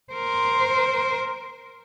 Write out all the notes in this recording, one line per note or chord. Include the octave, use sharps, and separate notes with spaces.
A#4 C5